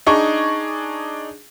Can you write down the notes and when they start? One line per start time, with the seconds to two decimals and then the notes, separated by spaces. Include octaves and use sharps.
0.06 D4 D#4 G#4 C#6